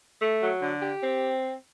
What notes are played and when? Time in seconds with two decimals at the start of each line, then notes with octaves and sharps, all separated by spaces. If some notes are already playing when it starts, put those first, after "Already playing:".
0.21 A3
0.41 F#3
0.61 D3
0.81 G4
1.01 C4